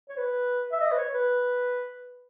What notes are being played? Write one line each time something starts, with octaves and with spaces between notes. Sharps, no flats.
C#5
B4
E5
D#5
B4
C#5
B4